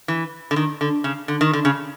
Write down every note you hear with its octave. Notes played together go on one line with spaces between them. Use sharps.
E3
D3
D#3
D3
C#3
D3
D#3
D3
C#3